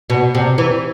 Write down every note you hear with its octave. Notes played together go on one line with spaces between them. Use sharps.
B2
C3
E3